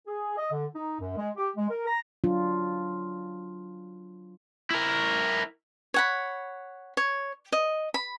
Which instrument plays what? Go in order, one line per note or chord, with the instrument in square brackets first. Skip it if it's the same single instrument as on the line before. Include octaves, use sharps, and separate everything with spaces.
[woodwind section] G#4
D#5
D3
D#4
F#2
G#3
G4
G#3
A#4
A#5
[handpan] F#3 D4 F4
[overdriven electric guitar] E4 A#4
[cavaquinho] C#5 F#5 B5
C#5
D#5
B5